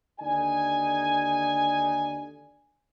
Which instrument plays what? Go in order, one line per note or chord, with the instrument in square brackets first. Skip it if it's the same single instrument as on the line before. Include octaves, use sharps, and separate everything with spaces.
[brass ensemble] D#2 D3 D#4 D5 G#5